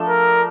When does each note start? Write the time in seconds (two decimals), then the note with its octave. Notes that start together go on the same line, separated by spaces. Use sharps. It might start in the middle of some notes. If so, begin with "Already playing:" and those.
Already playing: F3 A3 D4 A4
0.09 A#4